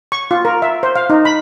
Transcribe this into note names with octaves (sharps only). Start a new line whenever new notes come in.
C#6
F4
A#4
E5
C5
F5
D#4
B5